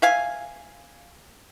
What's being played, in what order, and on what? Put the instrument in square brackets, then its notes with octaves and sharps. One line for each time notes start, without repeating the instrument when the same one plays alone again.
[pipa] E5 F5 G#5